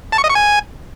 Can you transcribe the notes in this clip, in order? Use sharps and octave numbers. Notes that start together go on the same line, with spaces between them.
A5
C#6
D#5
C#6
G#5